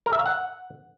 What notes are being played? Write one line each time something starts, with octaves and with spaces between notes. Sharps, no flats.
A#4
E5
F5
F#5